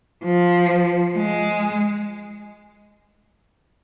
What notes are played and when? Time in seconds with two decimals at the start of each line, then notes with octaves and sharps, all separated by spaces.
0.24 F3
1.17 G#3